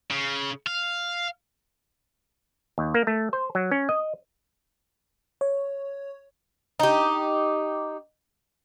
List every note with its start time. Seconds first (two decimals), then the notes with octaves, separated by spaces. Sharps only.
0.11 C#3
0.67 F5
2.78 D#2
2.94 A#3
3.07 A3
3.33 C5
3.55 F#3
3.71 C#4
3.89 D#5
5.41 C#5
6.80 D#4 G4